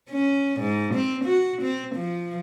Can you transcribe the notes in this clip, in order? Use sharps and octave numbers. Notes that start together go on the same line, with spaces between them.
C#4
G#2
C4
F#4
C4
F3